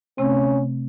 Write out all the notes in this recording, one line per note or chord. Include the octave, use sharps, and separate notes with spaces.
C3 A3 C4 C#4